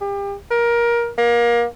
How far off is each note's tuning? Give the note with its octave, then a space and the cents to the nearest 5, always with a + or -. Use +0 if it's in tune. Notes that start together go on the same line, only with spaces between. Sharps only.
G4 +35
A#4 +20
A#3 +25